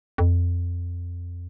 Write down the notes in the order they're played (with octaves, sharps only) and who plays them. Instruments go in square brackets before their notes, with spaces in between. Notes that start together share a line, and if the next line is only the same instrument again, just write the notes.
[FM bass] F2